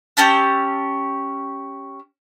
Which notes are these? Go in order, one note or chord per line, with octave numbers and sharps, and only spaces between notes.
C#4 G4 A5 E6